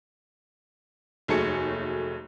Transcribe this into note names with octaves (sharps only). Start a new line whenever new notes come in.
F1 D#2 F#3 A3 G#4 C#7